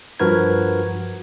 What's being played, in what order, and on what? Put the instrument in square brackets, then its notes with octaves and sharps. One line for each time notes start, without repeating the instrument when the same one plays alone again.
[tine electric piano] G2 F3 F#4 A#4 B4 G#6